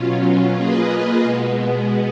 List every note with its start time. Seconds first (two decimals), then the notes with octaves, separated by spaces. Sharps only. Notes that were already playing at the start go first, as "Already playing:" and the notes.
Already playing: B2 F#3 C#4 F4
0.54 A#3 F4 G#4 B4 D#5
1.23 B2 G#3 B3